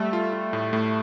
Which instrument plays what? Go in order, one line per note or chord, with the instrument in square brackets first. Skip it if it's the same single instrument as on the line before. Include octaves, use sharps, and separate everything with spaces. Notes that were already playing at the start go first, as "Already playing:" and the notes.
Already playing: [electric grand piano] G3 [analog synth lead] A3
[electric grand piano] F4
F4
A2
A2